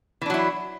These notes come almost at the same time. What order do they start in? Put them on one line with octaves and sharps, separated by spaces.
E3 D4 F#3 E4